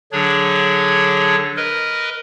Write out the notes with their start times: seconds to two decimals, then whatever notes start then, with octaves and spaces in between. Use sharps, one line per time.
0.12 D3 F#3 D4 G#4 C#5
1.57 A#4 B4 D#5